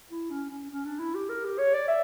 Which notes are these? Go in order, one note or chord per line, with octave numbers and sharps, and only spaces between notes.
E4
C#4
C#4
C#4
D4
E4
G4
A#4
G4
C#5
D5
E5